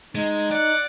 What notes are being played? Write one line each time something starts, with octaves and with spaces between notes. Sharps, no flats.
G#3 D#4
D5 F#5